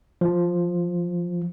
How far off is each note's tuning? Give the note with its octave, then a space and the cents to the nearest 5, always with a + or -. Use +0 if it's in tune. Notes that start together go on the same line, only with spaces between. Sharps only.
F3 +5